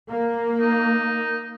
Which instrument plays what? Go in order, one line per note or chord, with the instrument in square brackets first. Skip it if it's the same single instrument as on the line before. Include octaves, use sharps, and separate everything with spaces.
[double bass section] A#3
[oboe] D#4